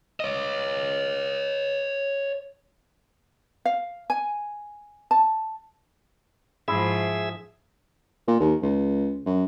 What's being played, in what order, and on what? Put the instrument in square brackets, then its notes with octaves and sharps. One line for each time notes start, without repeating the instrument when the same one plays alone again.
[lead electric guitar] C#5 D#5
[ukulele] F5
G#5
A5
[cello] G#2 F3 [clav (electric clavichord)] E4 [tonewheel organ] G#4 E5
[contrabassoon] A#2
D#2
C#2
F#2